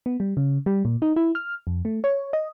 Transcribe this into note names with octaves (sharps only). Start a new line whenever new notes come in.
B3
G3
C#3
G3
A#2
D#4
E4
F6
F2
A3
C#5
D#5